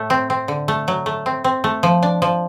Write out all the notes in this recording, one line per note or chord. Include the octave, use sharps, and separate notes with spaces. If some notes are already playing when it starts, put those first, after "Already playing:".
Already playing: A2 A3
C4
C4
D3
A3
F#3
A3
C4
C4
A3
F3
D4
F3